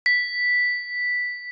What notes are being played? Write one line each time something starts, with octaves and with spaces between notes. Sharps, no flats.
B6